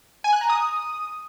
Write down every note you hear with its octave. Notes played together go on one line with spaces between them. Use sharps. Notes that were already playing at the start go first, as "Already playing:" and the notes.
G#5
F#6
A#5
D#6